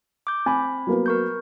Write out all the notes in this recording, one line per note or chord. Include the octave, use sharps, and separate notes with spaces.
D6 G6
C4 G#5 B5
F#3 A#3 B3
A#4 C#6 G6